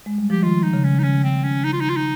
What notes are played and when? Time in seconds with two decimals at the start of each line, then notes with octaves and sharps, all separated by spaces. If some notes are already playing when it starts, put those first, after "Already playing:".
0.06 G#3
0.18 G3
0.30 F3 G4
0.43 D#3 F4
0.63 D#4
0.73 C#3
0.84 C#4
0.99 D#4
1.03 C#3 C#4
1.23 C4
1.44 C#4
1.64 D#4
1.73 F4
1.81 D#4
1.89 F4
1.97 D#4